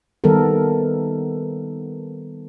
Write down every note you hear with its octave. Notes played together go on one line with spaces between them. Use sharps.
D#3 G3 B3 A4 A#4